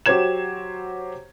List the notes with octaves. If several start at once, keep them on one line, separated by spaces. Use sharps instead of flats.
F#3 G4 C5 C#5 G#6 E7